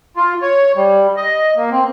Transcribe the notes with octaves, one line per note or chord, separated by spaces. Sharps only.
F4
C#5
G3
D#5
A#3
C4